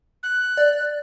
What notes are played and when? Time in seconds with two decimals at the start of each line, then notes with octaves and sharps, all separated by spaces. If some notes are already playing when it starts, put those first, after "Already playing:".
0.23 F#6
0.57 D5